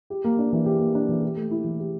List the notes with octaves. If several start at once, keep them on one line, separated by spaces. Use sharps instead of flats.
G4
A#3
D4
E3
G4
A#3
D4
E3
G4
A3
E4
E3
G4